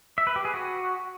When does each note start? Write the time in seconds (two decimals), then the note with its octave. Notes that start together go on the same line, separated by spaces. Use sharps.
0.18 E5
0.27 B4
0.36 G4
0.45 G#4
0.54 F#4